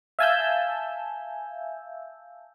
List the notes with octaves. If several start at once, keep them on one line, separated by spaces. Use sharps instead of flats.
E5 F5 G#5 A5 E6 G6